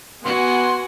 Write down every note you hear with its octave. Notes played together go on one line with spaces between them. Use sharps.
B3 F#4 F#5 G#5 C6